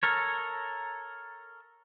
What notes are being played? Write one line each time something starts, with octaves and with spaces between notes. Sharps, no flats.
A4 A#4 C#5